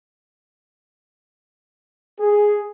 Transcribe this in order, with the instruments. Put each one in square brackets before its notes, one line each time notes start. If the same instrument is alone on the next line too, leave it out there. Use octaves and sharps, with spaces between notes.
[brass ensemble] G#4